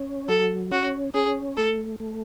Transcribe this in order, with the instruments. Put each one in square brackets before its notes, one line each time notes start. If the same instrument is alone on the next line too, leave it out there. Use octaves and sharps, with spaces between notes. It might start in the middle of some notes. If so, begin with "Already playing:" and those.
Already playing: [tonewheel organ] C#4
[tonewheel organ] F#3 [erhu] A4
[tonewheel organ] C#4 [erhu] F#4
[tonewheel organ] C#4 [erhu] G#4
[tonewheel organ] A3 [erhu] A4
[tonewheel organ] A3